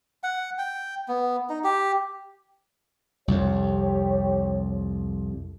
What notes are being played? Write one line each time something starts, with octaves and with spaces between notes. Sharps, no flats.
F#5
G5
B3
D#4
G4
C2 F2 G4 C#5